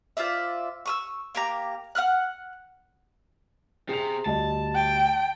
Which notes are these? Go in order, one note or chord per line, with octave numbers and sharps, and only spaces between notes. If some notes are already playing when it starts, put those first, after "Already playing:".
F4 C5 D5 E5
C#6 D#6 E6
A#3 G4 A#5
F#5 G5 F6 F#6
C3 G#4 F7
D2 G3 D#5 A5
G5